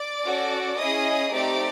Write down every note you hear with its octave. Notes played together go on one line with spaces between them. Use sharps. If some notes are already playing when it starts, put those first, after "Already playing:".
Already playing: D5 D6
C#4 F#4 A4
C#4 E4 G#4 D#5 D#6
A3 C4 D#4 G4 D5 D6